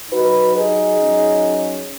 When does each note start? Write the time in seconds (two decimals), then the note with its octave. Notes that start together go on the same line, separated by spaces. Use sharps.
0.12 F#3 D#4 F#4 B4
0.56 D#4 G#4
1.00 F#3 C#4